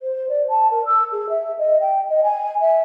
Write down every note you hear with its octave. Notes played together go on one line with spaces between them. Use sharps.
C5
D5
A5
A#4
E6
G#4
E5
D#5
G5
D#5
G#5
E5